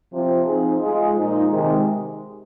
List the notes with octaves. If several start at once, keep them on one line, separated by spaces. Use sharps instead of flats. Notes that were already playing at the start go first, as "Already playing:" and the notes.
C3 F3 C4
F3 C4 D#4 G#4
G#3 F4 G#4
A#2 F3 G#3 D#4
C3 D#3 G#3